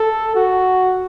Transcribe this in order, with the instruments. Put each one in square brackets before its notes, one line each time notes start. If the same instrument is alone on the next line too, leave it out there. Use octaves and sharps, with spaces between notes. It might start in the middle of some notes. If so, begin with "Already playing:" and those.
Already playing: [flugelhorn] A4
F#4